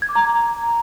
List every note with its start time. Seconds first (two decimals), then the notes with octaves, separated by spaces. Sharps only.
0.02 G#6
0.09 D6
0.16 A#5